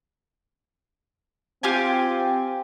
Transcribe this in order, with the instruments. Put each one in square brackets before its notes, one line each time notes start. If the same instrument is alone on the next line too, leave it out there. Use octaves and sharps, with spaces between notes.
[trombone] C4 [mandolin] F4 G4 G#5